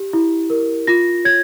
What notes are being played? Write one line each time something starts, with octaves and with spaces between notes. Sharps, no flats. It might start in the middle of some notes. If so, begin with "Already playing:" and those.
Already playing: G4
E4
A#4
F4 A#6
C#5 G#6